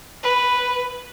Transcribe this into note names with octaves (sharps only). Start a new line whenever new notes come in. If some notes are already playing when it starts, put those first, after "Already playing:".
B4